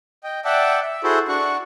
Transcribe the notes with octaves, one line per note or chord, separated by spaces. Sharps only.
D#5 G5
D5 E5 F#5 G5 A5
E5
E4 F#4 G#4 A4 C5
D4 F#4 F#5 C#6